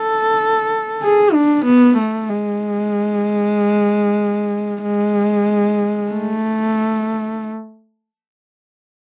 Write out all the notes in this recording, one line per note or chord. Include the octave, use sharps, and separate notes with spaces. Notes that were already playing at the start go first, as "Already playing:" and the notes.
Already playing: A4
G#4
D4
B3
A3
G#3
G#3
A3